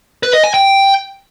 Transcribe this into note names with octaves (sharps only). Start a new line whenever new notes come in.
B4
D#5
G#5
G5